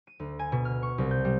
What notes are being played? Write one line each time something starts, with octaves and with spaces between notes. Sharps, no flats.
D#7
D2
G#5
B2
F6
C#6
C2
G6
G3